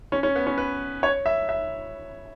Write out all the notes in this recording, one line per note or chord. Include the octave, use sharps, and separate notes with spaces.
C#4
C#4
B3
C#4
B4
C#5
E5
E5